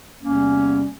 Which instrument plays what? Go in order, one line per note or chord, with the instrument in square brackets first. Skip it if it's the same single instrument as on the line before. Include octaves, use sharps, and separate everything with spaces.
[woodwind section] E2 C3 G3 A#3 C#4